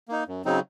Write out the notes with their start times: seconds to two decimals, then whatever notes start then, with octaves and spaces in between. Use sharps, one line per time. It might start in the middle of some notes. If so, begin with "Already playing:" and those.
0.09 A#3 D#4
0.27 F#2
0.45 C#3 F#3 C4 D#4